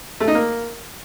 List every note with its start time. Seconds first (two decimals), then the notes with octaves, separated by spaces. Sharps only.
0.20 A3
0.28 D#4
0.35 A#3